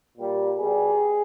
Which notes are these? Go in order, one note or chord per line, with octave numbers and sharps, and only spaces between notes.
A#2 G3
B2 G3 G#4